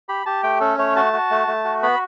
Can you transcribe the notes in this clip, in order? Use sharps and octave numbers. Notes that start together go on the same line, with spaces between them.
G4 B5
G4 A5
A3 G5
C#4 A4
A3 C#5
F#4 A5
F#4
A3
A3
F#4
B3 B5